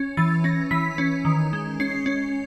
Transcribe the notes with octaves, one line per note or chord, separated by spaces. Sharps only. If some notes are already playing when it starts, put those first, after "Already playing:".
Already playing: C#4
E3 A6
C#4 A#6
E3 B6
C#4
D#3
G#3
C#4 C7
C#4